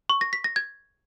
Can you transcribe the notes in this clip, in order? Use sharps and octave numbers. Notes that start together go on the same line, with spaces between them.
C#6
A#6
B6
A#6
G#6